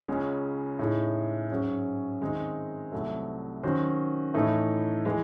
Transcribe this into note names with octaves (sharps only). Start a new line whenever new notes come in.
C#2 C#3 G#3 C#4
A2 G#3 D#4 G#4
G#2 F#3 C#4 G#4
D#3 G#3 C4 D#4 G#4
C2 C3 F#3 A3
D#3 F#3 C#4 F#4 C5
A2 E3 A3 D#4
E3 G#3